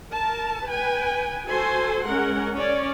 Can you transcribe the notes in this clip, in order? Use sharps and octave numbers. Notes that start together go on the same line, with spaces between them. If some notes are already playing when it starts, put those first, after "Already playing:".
A#4 A5
B4 G5 G#5
F#4 A4 C5 G#5 C6
G#3 C#4 A#4 F#5
C#4 C#5 D5